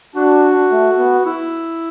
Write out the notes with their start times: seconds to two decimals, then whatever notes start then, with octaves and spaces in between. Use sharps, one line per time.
0.15 D4 F#4
0.71 A3
0.98 B3
1.26 E4